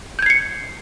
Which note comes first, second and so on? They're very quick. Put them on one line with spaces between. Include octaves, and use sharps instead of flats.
G6 G#6 C7 C#7